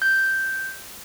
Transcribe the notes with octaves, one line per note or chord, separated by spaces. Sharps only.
G6